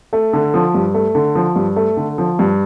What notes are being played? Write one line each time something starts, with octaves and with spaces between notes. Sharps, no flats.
A3
D3
F3
G2
A3
D3
F3
G2
A3
D3
F3
G2